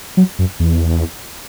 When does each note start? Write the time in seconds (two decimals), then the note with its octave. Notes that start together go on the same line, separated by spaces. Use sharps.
0.17 F#3
0.39 F#2
0.60 E2